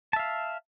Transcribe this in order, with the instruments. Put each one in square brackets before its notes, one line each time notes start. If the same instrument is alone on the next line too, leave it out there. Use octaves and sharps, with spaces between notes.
[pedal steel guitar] A5
E5
F5